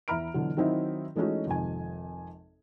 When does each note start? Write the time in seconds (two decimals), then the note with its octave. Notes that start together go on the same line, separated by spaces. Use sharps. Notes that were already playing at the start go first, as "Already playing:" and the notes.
0.08 E2 E5 A#5 B5 F6 D7
0.34 B2 D3 E3 F#3
0.57 D#3 F#3 C4 D#4 E4
1.16 E3 G#3 A3 C#4 D#4 F#4
1.47 G#1 F2 C3 D#4 G#5